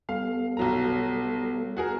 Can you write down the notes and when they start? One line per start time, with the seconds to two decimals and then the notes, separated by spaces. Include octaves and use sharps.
0.09 G3 B3 A4 F5
0.57 B1 F#3 A#5
1.77 F#4 G#4 A#4